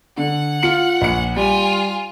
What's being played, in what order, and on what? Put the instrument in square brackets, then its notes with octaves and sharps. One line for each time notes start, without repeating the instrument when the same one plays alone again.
[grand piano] D3 [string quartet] F#5
[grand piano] F4 C#7 F#7
A#1 C#7
[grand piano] G3 [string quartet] F4 G#5